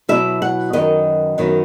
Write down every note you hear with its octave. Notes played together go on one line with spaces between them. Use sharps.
B2 F#3 B3 E4 E5
F#5
F#2 D#3 F#3 B3 D#5
F#2 D#3 F#3 B3